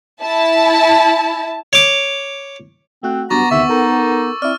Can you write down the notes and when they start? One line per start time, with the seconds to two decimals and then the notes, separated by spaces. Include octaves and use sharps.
0.22 E4 A5
1.73 C#5 D6
3.03 A3 C4 F#4 F#6
3.30 G2 F#3 B3 A#5 C#6 D6 A6
3.51 D2 C3 D#3 E5 C#6 E6
3.69 D#4 A4 A#4
4.42 C4 E4 D5 F6